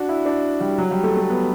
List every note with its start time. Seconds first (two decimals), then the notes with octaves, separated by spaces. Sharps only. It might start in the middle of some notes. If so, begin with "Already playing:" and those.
Already playing: D4 F#4
0.09 E4
0.26 D4
0.60 G3
0.78 F#3
0.91 G3
1.04 A3
1.17 A3
1.30 B3